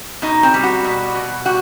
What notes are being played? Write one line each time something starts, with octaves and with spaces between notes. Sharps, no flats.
B2 D#4
C4
G3
F#4
B2
B2
G3 F#4